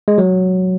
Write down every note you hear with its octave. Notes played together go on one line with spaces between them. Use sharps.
G#3
F#3